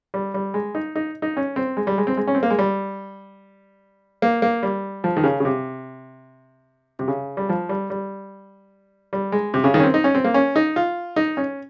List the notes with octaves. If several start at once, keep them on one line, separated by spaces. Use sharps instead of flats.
G3
G3
G#3
D#4
D#4
D#4
C#4
C4
G#3
G3
G#3
C4
G#3
C#4
C4
A#3
G#3
G3
A#3
A#3
G3
F3
D#3
C#3
C#3
C3
C3
C#3
G3
F3
G3
G3
G3
G#3
C3
C#3
D#3
C#4
C4
D#4
C#4
C4
A#3
C#4
D#4
F4
D#4
C#4